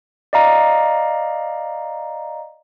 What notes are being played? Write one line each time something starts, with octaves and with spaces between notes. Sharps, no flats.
D5 D#5 F5 A#5